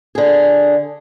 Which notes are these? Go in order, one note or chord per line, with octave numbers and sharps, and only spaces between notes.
D3 G#4